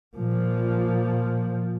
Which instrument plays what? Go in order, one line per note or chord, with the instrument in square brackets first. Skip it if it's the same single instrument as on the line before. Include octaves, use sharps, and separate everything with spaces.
[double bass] A#2 F3